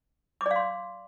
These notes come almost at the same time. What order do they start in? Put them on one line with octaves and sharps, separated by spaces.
D6 D5 F5 C6